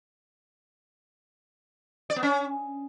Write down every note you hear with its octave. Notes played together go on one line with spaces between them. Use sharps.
D5
B3
C#4